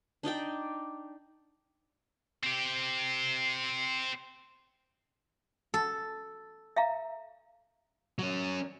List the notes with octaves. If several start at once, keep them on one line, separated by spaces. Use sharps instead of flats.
D4 D#4 D5 G5
C4 G4
A4
E5 F5 A#5
F#3 C#4